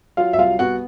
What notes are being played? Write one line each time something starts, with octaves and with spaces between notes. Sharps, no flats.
F#3 F4 F5
E5
C2 F4 F5
B3 F#4 F#5